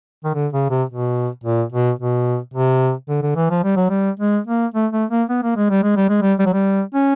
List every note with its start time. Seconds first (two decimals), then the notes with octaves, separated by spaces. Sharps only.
0.24 D#3
0.34 D3
0.53 C#3
0.70 C3
0.90 B2
1.44 A#2
1.72 B2
1.99 B2
2.54 C3
3.09 D3
3.23 D3
3.36 E3
3.50 F3
3.64 G3
3.76 F#3
3.90 G3
4.19 G#3
4.47 A#3
4.74 A3
4.92 A3
5.10 A#3
5.29 B3
5.43 A#3
5.56 G#3
5.70 G3
5.83 G#3
5.96 G3
6.09 G#3
6.22 G3
6.39 G3
6.46 F#3
6.53 G3
6.94 C#4